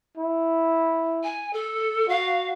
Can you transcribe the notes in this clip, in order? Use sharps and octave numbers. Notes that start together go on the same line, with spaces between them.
E4
G#5
A4
F#4 F5